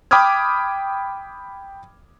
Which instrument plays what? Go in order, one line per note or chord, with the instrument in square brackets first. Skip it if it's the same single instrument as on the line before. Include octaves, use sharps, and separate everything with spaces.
[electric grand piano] G5 B5 D6 D#6 F6 G#6